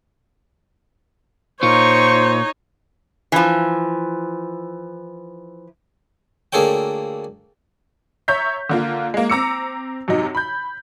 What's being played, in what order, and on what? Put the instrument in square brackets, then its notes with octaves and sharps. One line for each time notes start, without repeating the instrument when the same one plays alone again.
[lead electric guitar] A#2 F4 [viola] D#4 C#5 [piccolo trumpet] C5 [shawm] C#6
[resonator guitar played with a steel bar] E3 F3
[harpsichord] D2 A#3 G#4 A4 C#5 G5
[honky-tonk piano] C#5 E5 A#5 C#6 G6 B6
D3 A#3 F4
G#3 A#3
C4 A#5 D6 E6 C#7
F#2 C3 F#3 D#4
B5 G6